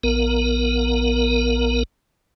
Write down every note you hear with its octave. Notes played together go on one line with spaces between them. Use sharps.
A#1 B3 A#4